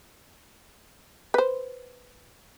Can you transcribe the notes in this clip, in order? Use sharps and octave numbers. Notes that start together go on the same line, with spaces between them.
B4 C5